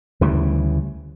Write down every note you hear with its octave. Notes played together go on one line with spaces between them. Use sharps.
D2 C#3 E3 G3